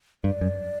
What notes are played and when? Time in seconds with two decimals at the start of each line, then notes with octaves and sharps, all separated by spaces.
0.24 G2 D5
0.41 F#2